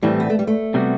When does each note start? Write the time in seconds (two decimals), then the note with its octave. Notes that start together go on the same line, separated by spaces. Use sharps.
0.02 A2 E3 G3 A3 C4
0.20 B3
0.30 A3
0.39 G3
0.47 A3
0.74 C3 G3 B3 F#4